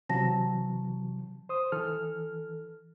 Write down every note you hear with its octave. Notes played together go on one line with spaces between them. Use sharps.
C3 E3 F#3 A5 A#6
C5 D#6
E3 A4 F6